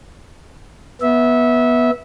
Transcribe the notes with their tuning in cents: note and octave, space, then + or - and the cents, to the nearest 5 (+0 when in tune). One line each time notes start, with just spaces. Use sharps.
B3 -15 E5 -20